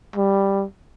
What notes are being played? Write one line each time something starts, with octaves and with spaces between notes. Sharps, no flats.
G3